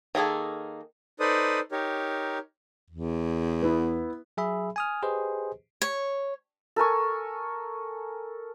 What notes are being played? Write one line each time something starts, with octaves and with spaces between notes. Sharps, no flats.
D#3 A#3 G#4 A4
D#4 A4 B4 C5 D5 D#6
D#4 G4 A#4 C#5
E2
B3 E4
F#3 G#4 E5 B5
G#5 D#6 F6
G4 G#4 B4 C5 D#5
C#5
A4 A#4 G#5 C#6